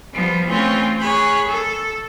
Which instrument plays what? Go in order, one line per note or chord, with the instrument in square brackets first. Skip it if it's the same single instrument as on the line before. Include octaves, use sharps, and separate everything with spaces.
[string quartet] F3 G3 B3
E3 A3 C4 C#4 F4
G#4 C#5 B5 F#6
A4